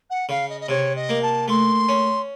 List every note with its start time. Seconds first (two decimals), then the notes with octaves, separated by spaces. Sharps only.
0.10 F#5
0.29 C#3 F5
0.49 D#5
0.61 D#5
0.69 C3 C#5
0.96 D#5
1.09 A#3
1.22 A5
1.48 A3 C6
1.89 C#4